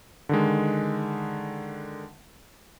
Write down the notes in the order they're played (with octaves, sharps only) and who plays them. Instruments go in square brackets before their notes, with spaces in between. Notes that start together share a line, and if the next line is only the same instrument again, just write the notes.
[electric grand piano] D3 D#3 G#3